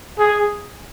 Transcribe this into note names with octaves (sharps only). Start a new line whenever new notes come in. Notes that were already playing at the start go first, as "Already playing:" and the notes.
G#4